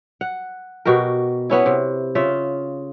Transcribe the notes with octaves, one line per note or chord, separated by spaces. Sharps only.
F#5
B2 F#4 G4 A#4
B3 C#4 E4
C3
C#3 F4 E5